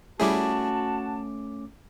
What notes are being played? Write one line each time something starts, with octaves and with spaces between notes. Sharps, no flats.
G3 A3 C#4 E4 F#4 G#4 A5 D6